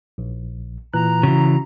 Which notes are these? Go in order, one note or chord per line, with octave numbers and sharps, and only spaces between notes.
A#1
A#2 E3 A#5 F#6
C#3 E3 F#4